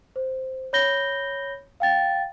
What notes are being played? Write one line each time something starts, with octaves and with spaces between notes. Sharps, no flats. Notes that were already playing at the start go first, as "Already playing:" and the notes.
C5
C#5 B5 G6 A#6 G7
F5 G5 A6